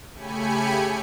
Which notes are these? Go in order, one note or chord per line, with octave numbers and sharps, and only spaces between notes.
C#3 A3 G4 G#5 B5 C#7